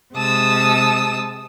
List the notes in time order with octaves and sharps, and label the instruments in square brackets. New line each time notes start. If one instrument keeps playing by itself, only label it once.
[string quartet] C3 G#3 A5 D#6 E6